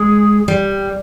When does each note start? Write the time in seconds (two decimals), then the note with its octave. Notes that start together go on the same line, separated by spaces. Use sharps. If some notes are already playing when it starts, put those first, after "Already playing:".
Already playing: G#3 G#4
0.48 G3